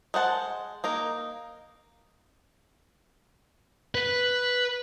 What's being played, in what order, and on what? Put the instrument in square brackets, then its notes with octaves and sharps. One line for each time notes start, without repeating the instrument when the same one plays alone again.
[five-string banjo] G#3 C5 F#5 A5
A#3 D#4 A#4
[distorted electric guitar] B4